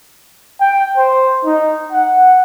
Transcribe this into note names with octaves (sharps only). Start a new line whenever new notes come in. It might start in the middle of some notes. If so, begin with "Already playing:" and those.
G5
C5
D#4
F#5